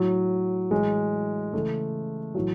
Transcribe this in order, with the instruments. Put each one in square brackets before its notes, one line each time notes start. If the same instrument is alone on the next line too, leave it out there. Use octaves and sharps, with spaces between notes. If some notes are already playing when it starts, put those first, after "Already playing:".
Already playing: [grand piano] A2 F#3
A2 E3 G#3
C#3 E3 A3
A2 E3 F#3